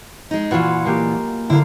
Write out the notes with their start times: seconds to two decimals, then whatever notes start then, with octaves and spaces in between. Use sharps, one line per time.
0.31 G#3 D#4
0.51 A#2 E3 F4 F#4 B4
0.85 G#3 A#3 G4
1.50 D3 A#3 E4